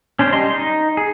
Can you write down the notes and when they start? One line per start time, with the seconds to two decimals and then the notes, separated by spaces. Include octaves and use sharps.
0.19 C#4 D4 C5
0.33 G3 D#5 C6
0.50 D#4
0.97 G#4